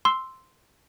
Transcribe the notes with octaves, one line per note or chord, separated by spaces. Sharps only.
C6 E6